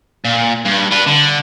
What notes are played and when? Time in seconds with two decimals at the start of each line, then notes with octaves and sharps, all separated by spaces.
0.25 A#2
0.65 G2
0.91 D4 B4
1.06 D3